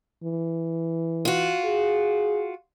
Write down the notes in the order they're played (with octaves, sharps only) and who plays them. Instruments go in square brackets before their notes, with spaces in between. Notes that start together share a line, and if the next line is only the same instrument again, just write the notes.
[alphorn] E3
[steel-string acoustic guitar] F4 F#4
[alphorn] G#4